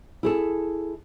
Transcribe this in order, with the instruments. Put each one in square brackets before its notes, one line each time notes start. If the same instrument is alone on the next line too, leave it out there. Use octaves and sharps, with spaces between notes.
[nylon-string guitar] E4 G#4 A4